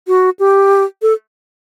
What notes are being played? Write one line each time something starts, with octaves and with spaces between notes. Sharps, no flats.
F#4
G4
A4